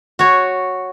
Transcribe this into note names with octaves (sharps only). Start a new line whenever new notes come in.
F#4 C#5